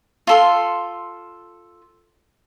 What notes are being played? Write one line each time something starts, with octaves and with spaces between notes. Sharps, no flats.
F4 A4 C6